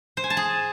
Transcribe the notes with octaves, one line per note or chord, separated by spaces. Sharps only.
C5
G#5
A5
G#4